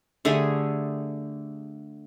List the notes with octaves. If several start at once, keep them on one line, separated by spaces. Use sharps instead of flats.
D3 A3 G4 G#4